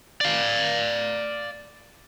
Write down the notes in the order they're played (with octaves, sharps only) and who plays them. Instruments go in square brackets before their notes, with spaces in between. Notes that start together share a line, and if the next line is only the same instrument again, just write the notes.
[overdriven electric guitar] D5 F5